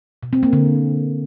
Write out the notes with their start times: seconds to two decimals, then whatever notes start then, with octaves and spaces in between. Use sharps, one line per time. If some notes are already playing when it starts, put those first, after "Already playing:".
0.23 B2
0.33 C4
0.43 A#3
0.53 D3